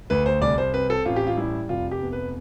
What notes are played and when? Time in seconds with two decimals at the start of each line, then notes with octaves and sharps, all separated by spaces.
0.10 D2 B4
0.26 C5
0.41 C2 D5
0.58 C5
0.74 C4 B4
0.90 A4
1.05 A1 F4
1.16 G4
1.27 F4
1.37 G3 E4
1.69 F1 F4
1.91 G4
2.02 B3
2.13 B4